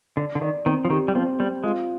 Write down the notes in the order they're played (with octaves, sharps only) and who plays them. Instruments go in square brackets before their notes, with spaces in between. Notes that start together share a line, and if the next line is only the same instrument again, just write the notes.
[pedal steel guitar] D3 [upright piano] D5
[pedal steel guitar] D3
[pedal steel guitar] D#3 [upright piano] D5
[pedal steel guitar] D#3 [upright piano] C4
[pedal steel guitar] F3
[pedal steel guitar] D#3 [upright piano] G4
[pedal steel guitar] G3
[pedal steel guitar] F3 [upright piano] C4
[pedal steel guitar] G3 [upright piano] C4
[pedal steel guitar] G#3 [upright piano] F4